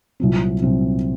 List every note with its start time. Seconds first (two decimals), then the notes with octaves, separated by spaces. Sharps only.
0.20 C2 A#2 F#3 C4
0.62 C2 A#2 F#3 C4